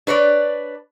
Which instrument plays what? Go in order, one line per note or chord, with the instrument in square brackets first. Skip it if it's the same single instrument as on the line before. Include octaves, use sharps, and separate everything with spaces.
[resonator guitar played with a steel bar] D4 B4 C#5 D5